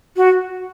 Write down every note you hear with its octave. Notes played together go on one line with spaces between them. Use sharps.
F#4